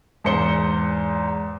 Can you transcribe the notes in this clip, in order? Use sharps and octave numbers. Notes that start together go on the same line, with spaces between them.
E2 G#2 C5 C#7 G7